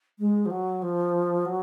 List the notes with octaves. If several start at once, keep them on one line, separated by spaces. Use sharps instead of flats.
G#3
F3
F#3
F3
F#3